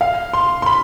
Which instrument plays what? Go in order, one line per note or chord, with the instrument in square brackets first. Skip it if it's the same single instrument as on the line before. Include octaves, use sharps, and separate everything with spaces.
[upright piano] F5
C6
C6
B5